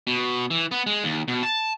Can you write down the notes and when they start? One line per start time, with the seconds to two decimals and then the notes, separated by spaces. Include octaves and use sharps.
0.07 B2
0.51 E3
0.71 B3
0.87 G#3
1.04 D#2
1.28 B2
1.43 A5